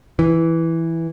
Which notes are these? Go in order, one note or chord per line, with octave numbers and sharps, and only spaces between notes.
E3